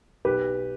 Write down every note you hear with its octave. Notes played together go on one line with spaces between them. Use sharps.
B1 G4 B4